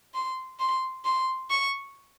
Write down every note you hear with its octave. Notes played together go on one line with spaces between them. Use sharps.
C6
C6
C6
C#6